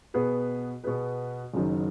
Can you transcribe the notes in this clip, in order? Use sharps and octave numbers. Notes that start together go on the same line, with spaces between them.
B2 B3 G#4 B4
B2 B3 G#4 B4
F#1 F#2 D#3 F#3